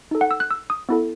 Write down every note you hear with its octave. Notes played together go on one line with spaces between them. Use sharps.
D#4 A4
F#5
E6
F#6
E6
D#6
B3 E4 A4